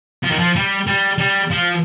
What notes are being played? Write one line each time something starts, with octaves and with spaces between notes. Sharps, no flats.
F3
D#3
F3
G3
G3
G3
F3